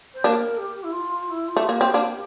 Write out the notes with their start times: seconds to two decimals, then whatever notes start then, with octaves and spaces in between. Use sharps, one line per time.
0.14 C5
0.24 A#3 D4 A#4
0.58 G4
0.84 E4
0.92 F4
1.27 F4
1.30 E4
1.48 F4
1.57 A3
1.62 F4
1.69 A#3 G4
1.81 C4
1.94 A#3 D4